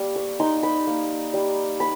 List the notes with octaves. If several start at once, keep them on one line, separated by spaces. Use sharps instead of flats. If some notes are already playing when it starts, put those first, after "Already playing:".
Already playing: G3 A#3
C#6
D#4 C6
B5
A#3
G3
B5